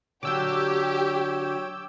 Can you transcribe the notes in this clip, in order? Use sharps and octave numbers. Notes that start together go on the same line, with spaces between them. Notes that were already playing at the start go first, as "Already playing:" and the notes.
D3 F#3 G4 C#5 G5 D6 E6 G6